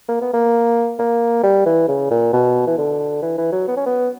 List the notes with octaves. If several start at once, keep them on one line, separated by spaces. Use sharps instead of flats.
A#3
B3
A#3
A#3
G3
E3
C#3
A#2
B2
E3
D3
E3
E3
F#3
B3
C#4
B3